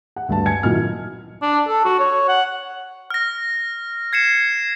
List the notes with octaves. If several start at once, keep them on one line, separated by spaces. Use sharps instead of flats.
F#5
D2 G2 A5
G#5 G#6 C#7
A#1 A#2 D#3 F#3 E4 F6
D4
A4
F#4
C#5
F#5
F6 A#6
G#6 C7 C#7 E7